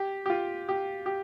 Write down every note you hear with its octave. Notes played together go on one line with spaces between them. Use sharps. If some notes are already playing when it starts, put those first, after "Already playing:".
Already playing: G4
G4
F4
G4
G4